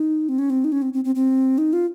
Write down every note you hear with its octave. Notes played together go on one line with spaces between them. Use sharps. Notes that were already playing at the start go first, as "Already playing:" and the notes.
Already playing: D#4
C4
C#4
C4
D#4
C#4
C4
C4
C4
C4
D#4
F4